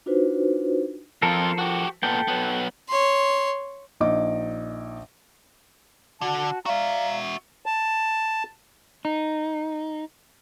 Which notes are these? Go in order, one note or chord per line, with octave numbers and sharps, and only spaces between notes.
D4 D#4 F4 F#4 B4 C5
F2 F3 F4 A4 A#4
F#4 G4
A#2 B3 A4 G5
F#3 B3
C#5 C6
A#1 D#4 D#5 D6
D3 F#4 A5
F#4 D5 E5 F5 A#5
A5
D#4